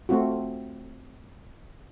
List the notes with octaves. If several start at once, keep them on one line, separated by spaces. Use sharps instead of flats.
A3 C4 F4 F#4